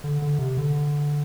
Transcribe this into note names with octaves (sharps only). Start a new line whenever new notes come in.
D3
D3
C3
D3